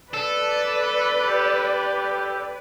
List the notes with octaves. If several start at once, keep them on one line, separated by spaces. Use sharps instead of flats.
A4 B4 D5
G4